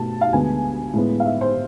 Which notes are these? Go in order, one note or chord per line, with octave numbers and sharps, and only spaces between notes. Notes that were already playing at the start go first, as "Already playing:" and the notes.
Already playing: B2 A3 A5
F5
D2 D3 G#3 B3 G#5
A2 G#3 B3
F5
E5
C5